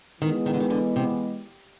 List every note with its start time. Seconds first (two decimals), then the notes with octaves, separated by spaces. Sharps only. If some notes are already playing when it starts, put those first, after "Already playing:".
0.21 D#3 E3 G#3 B3
0.46 D#3
0.53 D3
0.60 D#3
0.70 D3
0.96 C3